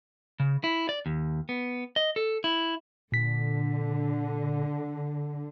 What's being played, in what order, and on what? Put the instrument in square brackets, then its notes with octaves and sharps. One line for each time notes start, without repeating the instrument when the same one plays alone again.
[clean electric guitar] C#3
E4
D5
D#2
B3
D#5
A4
E4
[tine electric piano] A#2 B6 [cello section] D3